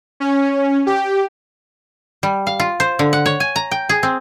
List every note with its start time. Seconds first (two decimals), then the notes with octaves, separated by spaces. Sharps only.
0.20 C#4
0.86 G4
2.23 G3
2.47 F5
2.60 F4
2.80 C5
2.99 D3
3.13 F#5
3.26 C#5
3.40 G#5
3.56 A#5
3.71 G5
3.89 G#4
4.03 C4